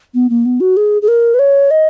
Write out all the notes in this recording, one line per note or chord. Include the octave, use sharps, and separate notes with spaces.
B3
A#3
B3
F#4
G#4
G#4
A#4
B4
C#5
D#5